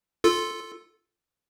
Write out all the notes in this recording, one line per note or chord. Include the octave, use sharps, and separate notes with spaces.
F4 A4